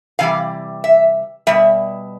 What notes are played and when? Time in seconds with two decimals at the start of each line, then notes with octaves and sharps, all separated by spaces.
0.19 C3 E3 G3 F5
0.84 E5
1.47 B2 G3 E5